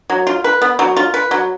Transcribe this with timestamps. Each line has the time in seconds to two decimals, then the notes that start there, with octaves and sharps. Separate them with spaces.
0.10 F#3
0.27 F4
0.44 B4
0.62 B3
0.79 F#3
0.97 F4
1.14 B4
1.31 F#3